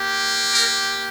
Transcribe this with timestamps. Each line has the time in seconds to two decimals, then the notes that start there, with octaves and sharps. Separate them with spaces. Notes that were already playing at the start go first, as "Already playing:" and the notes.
Already playing: A#3 G4
0.54 A#4